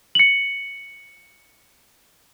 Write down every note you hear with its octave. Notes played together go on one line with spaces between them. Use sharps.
C#7 F#7